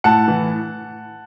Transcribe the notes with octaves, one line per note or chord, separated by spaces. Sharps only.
A2 F#5 A5
E3